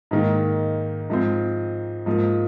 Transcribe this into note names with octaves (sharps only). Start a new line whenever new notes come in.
G#2 D#3 A#3
G#2 F3 C4
G#2 F3 A#3